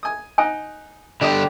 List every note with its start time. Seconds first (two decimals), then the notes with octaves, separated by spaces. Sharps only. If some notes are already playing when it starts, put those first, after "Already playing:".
0.03 G#5 D#6
0.38 D#4 D#5 F#5 G#5
1.21 D3 D4 G4 D#5 G5